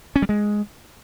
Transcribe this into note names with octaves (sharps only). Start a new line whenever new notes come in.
C#4
G3
G#3